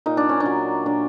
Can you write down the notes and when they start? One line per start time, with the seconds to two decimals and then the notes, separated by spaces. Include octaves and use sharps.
0.06 A#2 D#4
0.17 D4
0.29 C#4
0.40 D4
0.46 F#3
0.86 A#2 D4